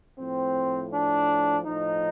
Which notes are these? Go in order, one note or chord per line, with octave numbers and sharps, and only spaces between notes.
A2 F3 C4
D4
A2 F3 D#4